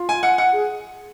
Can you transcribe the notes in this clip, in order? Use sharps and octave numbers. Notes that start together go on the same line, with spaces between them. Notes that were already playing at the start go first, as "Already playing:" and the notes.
Already playing: F4
G#5
F#5
F#5
G#4